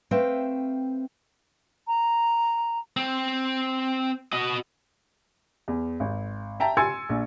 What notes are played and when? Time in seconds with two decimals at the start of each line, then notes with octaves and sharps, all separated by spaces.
0.11 A3 C4 B4 E5 F5 G5
1.88 A#5
2.97 C4
4.33 F#4 D#5
5.68 E2
6.00 G#1
6.60 E5 G5 A5 A#5
6.77 G#5 C6 E6 G#6 A6 C#7
7.09 A#1